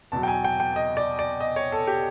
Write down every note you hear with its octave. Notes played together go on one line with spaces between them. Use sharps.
E2 B2 F#3 A5
G5
G#5
G5
G5
D#5
D5
D5
D#5
C#5
A4
G4